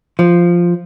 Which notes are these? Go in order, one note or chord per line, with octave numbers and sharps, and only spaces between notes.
F3